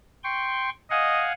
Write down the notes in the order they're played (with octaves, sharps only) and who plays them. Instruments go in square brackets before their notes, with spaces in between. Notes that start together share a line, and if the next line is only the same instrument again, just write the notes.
[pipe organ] G5 C6 C#6
[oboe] D#5 [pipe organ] F5 F#5 G#5